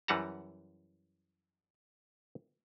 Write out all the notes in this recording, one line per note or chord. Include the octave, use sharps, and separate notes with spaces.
F#2 E3 G3 F#5 A5 A#5